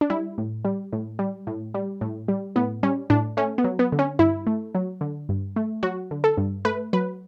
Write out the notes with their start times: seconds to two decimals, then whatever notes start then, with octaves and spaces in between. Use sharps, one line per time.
0.01 D4
0.10 G3 E4
0.38 A2
0.65 G3
0.93 A2
1.19 G3
1.47 A2
1.74 G3
2.01 A2
2.28 G3
2.56 A2 B3
2.83 G3 C#4
3.10 A2 D4
3.37 A3 C#4
3.58 B3
3.64 F#3
3.79 B3
3.92 D3
3.99 C#4
4.19 G2 E4
4.47 A3
4.75 F#3
5.01 D3
5.29 G2
5.56 A3
5.83 F#3 F#4
6.11 D3
6.24 A4
6.37 G2
6.65 A3 B4
6.93 F#3 B4